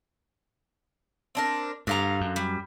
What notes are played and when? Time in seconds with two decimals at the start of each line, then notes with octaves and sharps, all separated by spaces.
1.35 C4 D4 A#4
1.87 G2 D3 F5 A#5
2.21 F#2
2.36 G3